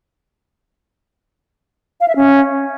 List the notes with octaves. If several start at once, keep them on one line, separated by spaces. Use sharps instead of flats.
F5
E5
C#4